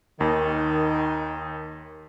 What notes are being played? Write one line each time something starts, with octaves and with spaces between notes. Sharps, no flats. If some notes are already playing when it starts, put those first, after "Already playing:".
D#2 D#3